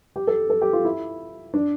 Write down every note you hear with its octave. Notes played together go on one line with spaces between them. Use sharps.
G4
A4
A4
G4
F4
E4
D4